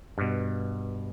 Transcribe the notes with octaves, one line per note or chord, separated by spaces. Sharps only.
G2 B2